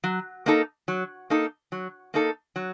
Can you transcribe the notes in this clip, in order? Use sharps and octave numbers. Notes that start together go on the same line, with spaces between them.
F#3
A#3 D#4 A4
F#3
A#3 D#4 A4
F#3
A#3 D#4 A4
F#3